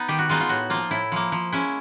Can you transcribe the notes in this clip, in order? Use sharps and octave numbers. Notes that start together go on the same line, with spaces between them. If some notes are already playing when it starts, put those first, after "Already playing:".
Already playing: B3 D#4
D#3 G4
F#4
G#3 B3 D#4 F4
F4
A2 F#4
F3 A#3 F4
A2 E4
F3 A#3
F3
G#3 C#4 E4